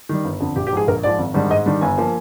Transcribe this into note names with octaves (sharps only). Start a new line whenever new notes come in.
D#3 G3
G1
F2 D3
A#1 G4
G4
G#2 F3 G#4
A#1 A#4
G#2 F3 D5
G#1
G#2 D#3 G3 D4
G#2 D#5
D#3 G3 D4
G1 G#5
F3 A#3